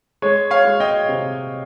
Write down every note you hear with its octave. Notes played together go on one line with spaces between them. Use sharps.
G#3 C#5
C#5 F5
G#3
D#5 G5
C3